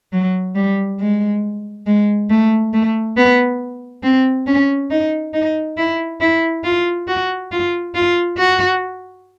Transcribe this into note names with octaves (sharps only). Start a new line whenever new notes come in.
F#3
G3
G#3
G#3
A3
A3
B3
C4
C#4
D#4
D#4
E4
E4
F4
F#4
F4
F4
F#4